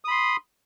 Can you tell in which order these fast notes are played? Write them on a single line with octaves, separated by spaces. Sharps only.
D#6 B5 C6